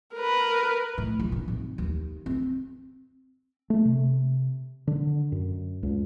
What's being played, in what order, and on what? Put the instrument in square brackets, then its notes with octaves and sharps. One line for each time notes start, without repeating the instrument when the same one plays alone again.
[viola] A#4 B4
[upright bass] A2
A#1
A#2
G#1
D#2
C4
[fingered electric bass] A3
C3
D3
F#2
C#2